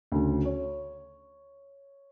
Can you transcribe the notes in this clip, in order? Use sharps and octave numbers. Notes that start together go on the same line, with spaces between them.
D2 C#3
C#5